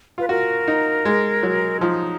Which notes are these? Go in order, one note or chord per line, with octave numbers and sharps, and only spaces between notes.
F4 B4
F#4 A#4
D#4
G#3
F#3
F3 D#4